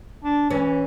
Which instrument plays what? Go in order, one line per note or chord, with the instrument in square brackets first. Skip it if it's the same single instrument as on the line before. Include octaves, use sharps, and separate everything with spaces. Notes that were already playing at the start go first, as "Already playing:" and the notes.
[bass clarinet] D4
[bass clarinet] E3 [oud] C#4